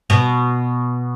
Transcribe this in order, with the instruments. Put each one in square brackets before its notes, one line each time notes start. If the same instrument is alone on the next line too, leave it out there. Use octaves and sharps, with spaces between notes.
[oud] B2